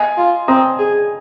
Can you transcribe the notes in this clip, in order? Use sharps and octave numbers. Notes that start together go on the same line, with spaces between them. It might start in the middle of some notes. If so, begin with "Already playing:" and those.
Already playing: D#5 G#5
F4
C4 A#5 D#6
G#4